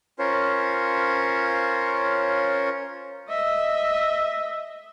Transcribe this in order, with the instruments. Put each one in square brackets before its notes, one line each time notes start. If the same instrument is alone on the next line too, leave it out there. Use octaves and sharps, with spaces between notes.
[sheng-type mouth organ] C#4 F4 A#4 C5 C#5
[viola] D#5 E5